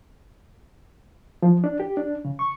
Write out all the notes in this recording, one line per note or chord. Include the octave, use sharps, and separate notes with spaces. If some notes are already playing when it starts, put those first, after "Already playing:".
F3
D4
G4
D4
C#3
C#6